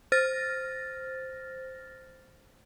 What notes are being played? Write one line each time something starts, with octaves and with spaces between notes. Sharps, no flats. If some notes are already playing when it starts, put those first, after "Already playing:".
C5 F6 A6 A#6